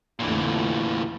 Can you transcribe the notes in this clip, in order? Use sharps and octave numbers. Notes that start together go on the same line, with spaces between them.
F1 A#2 D3 E3 A3